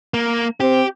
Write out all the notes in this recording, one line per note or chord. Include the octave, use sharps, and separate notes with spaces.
A#3
C4 G4